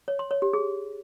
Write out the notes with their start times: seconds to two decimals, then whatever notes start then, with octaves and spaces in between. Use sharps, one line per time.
0.08 C#5
0.19 C6
0.31 C#5
0.42 G4
0.53 G#4